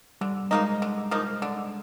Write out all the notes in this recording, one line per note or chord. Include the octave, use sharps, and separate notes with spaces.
D3 G3
F3 G#3 A#3 D#4
D3
F3 A#3 D#4
D3